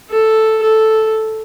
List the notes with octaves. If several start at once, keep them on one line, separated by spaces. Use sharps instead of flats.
A4
A4